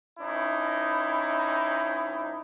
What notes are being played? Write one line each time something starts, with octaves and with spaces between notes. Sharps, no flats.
D2 C#4 D#4 E4